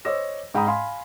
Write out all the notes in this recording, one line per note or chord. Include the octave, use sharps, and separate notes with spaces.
C5 C#5 D#5 D6 E6 A#6
G#2 G5 A#5 B5 D#6
F5 G#5 B5 C6